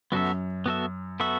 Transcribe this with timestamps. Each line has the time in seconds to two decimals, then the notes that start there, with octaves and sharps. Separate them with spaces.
0.12 F#2 B3 F#4 A4 E5
0.66 B3 F#4 A4 E5
1.20 B3 F#4 A4 E5